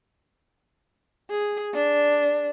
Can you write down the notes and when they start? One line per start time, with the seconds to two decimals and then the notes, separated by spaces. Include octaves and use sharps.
1.30 G#4
1.74 D4